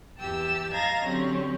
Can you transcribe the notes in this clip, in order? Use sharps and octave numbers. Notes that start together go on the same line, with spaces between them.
E2 G4 G5 A5 E6
D#5 F5 A5 A#5 G#6 A#6
D3 F#3 C4 C#4 G4